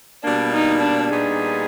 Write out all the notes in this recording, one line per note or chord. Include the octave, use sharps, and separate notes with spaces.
B2 G3 A#3 D4
D#4
D4
A#2 G3 B3 D#4 G#4